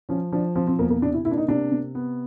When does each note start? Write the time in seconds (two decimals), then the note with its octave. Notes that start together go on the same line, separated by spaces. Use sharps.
0.09 F3 C#4
0.32 F3 D4
0.55 F3 C4
0.67 C4
0.79 E2 A#3
0.90 A#3
1.02 C3 D4
1.14 E4
1.25 A#3 E4
1.31 D4
1.37 D#4
1.48 C3 D4
1.72 C3
1.95 B3